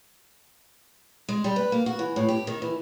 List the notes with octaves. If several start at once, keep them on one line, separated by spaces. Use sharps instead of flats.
G#3
G3
B4
A#3
F#4
E3
A2
G4
D#3
E3